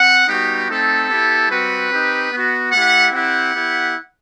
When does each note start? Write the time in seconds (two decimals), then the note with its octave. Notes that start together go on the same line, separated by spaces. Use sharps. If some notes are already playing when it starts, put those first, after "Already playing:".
Already playing: C4 F#5
0.27 G3 B3 D#4 F#4 G4
0.68 A3 C4 D#4 A4
1.09 B3 E4 G4
1.49 G3 C4 F#4 B4
1.90 C4 D#4 G4
2.31 B3 F#4
2.71 A3 E4 G4 F#5
3.12 C4 E4 G4 F#5
3.54 B3 E4 G4